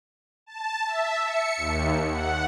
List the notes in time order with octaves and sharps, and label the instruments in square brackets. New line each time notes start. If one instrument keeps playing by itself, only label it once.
[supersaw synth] A5
E5
C#7
D#2
F#5